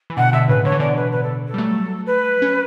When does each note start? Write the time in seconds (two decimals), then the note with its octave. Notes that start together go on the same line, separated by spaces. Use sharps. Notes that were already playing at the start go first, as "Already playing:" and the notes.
0.10 E3
0.17 B2 D3 F#5
0.33 B2 D3 E5
0.48 A2 C#3 B4
0.64 D3 C#5
0.72 E3
0.80 B2 D3 D5
0.95 B4
1.11 B4
1.23 A4
1.47 A4
1.54 G3
1.58 F#3 A3
2.06 B4
2.42 C#4